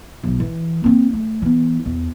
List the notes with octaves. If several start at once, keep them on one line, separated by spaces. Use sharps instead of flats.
B1 D#3
E3
A#3 C4
A3
E3 B3
E2